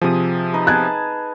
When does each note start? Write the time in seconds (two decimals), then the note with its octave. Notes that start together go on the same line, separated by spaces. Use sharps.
0.01 C3 F3 G#4 D#6
0.53 D#4 B4
0.67 G#4 A5 F#6 G#6